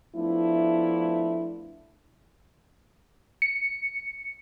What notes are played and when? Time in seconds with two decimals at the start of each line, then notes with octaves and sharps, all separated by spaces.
0.16 F3 A3 B3 D4 E4
3.42 C#7